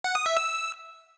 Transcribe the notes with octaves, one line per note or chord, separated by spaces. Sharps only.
F#5
D#6
E5
E6